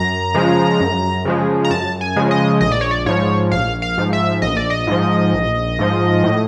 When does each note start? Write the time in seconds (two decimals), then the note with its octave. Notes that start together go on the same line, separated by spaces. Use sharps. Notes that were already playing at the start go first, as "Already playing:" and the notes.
Already playing: F#2 A#5
0.35 C#3 F3 G#3
0.81 F#2
1.25 C#3 F3 G#3
1.64 A#5
1.70 F#2 A5
2.01 G#5
2.16 C#3 F3 G#3
2.31 D#5
2.61 A#1 D#5
2.72 D5
2.81 C#5
2.91 D5
3.06 G#2 F3 C#5
3.52 A#1 F5
3.82 F5
3.98 G#2 F3
4.13 E5
4.42 A#1 D#5
4.57 D5
4.70 D#5
4.87 G#2 F3
5.33 A#1
5.79 G#2 F3
6.24 A2